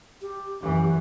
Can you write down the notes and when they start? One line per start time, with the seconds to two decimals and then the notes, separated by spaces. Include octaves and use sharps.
0.22 G4
0.61 F#2 E3